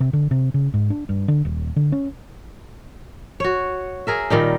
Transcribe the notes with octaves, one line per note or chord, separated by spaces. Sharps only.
C3
D3
C3
C#3
G#2
D4
G2
D3
D#1
D3
C#4
F#4 C#5
G#4 A#4 E5
A#2 D#3 G3 D#4